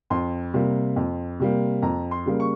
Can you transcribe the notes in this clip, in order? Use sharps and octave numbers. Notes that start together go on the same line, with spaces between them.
F2 C6
C3 G3 A#3
F2
C3 G3 A#3
F2 A#5
C6
C#3 G3 A#3
C#6